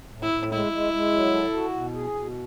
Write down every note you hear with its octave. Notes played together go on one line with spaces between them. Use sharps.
A2
E4
A2
G#3 E4
G#3
G#3
F#3
A4
F#4
B2
G#4
B2